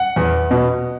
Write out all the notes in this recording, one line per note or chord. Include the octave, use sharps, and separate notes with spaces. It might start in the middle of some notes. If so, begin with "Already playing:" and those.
Already playing: F#5
E2
B2